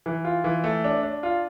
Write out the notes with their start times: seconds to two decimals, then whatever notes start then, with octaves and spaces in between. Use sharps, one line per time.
0.06 E3
0.25 F4
0.44 E3
0.64 A3
0.84 D4
1.03 D4
1.23 F4